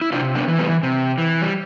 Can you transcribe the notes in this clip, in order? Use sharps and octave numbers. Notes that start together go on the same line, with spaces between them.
E4
C3 D4 F4
B3 D4
E3
G3 B3
C3
E3
G3